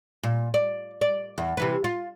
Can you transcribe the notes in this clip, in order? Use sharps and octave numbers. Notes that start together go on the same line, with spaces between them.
A#2
D5
D5
E2
C3 E3 B4
F4